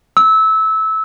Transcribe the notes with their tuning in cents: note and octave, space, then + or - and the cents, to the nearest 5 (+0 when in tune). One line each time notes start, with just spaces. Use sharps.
E6 -20